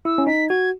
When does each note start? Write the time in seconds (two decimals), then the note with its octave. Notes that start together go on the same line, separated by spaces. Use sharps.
0.05 E4 E6
0.18 C#4
0.27 D#4 B6
0.49 F#4 G#6